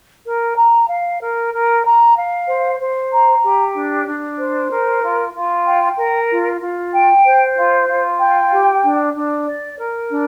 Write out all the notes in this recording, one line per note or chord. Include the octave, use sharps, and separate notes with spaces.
A#4
A#5
F5
A#4
A#4
A#5
F5
C5
C5
A#5
G4
D4
D4
C5
A#4
F4
F4
G5
A#4
F4
F4
G5
C5
F4
F4
G5
G4
D4
D4
D5
A#4
D4